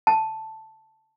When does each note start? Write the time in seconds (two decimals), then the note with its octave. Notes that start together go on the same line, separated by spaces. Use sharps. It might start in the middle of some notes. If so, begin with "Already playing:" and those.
0.07 A5